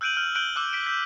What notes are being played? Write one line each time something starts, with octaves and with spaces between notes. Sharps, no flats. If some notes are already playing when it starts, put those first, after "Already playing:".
E6 F#6 G6 D7 D#7 F#7
F6 G6
F#6 G6 D7 D#7 F#7 G7
D6 E6 F#6
B6 D7
G6 B6